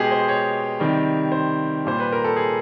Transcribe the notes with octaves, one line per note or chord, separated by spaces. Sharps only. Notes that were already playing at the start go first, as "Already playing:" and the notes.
Already playing: B2 G#3 G4 G#4
C5
C#5
C3 D#3 G3
C5
A#2 G3 C5
B4
A#4
A4
G#4